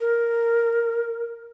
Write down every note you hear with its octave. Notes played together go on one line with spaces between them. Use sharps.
A#4